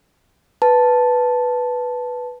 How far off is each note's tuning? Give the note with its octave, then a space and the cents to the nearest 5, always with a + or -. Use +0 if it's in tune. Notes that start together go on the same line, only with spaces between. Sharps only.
B4 +0 A5 -5